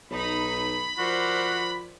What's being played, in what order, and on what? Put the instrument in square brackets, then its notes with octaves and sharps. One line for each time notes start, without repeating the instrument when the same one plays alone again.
[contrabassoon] B1 [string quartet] D#4 [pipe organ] B5
[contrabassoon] F3 [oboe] F#4 [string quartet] A#4 C5 D5